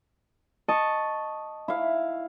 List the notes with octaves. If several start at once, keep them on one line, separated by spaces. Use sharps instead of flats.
D#5 A5 C#6
E4 F5